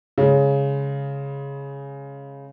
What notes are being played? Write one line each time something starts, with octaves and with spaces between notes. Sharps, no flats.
C#3 G#3